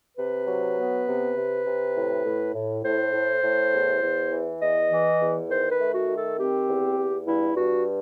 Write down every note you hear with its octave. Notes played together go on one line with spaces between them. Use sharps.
C3 B4
F#3
B3
C3
C3
C3
A2
A2
A2
A2 C5
A2
A2
E2
E2
E3
E2 D#5
E3
E2
D#3 C5
B4
A3
F#4
D#3
A4
C4 G4
E2
E2
G2 E4
G2 F#4